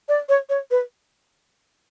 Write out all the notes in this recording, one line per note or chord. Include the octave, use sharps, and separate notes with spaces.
D5
C#5
C#5
B4